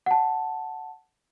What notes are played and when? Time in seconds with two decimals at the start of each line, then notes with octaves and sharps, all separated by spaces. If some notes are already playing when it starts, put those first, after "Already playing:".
0.06 F#5 A5